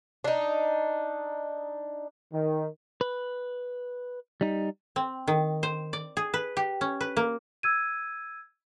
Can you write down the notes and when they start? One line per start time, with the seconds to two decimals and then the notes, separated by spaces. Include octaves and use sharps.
0.24 D4 D#4
2.33 D#3
3.01 B4
4.41 G3 D#4
4.96 C4
5.27 D#3
5.63 C5
5.93 D5
6.17 G#4
6.34 B4
6.57 G4
6.81 C#4
7.01 B4
7.17 A#3
7.63 E6 G#6 D#7